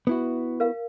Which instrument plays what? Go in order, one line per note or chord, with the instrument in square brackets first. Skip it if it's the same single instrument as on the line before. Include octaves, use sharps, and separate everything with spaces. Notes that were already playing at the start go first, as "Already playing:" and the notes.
[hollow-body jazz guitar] B3 E4 F#4
[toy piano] A#4 F5